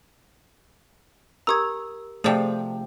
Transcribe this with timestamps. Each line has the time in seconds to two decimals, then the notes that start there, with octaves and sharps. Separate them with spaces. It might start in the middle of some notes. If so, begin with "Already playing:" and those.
1.47 G4 A#4 A#5 D#6 E6 G#6
2.24 C3 F3 A3 G#4 D5 G5